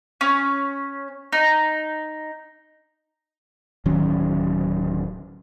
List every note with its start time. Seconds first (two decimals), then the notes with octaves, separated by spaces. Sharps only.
0.21 C#4
1.33 D#4
3.86 D1 D#3 F#3 C#4